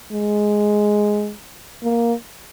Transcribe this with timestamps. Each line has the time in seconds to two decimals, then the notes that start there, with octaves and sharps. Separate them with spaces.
0.12 G#3
1.83 A#3